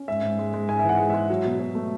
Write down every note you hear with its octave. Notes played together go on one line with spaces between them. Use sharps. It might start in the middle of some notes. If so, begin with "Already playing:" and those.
Already playing: C#4
G#2 E5
G#2
G#3
G#3
G#2 G#5
E5
E3 F#5
G#3
G#3 E5
F#3
B2
B2
A3